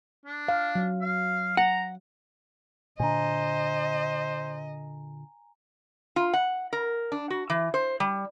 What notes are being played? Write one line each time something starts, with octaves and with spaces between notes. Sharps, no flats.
D4
F5
F#3
F5
F#5 A#5
A#2 D3 D4 C5 D#5 G#5 A#5
F4
F#5
A#4
D4
F#4
E3
C5
G3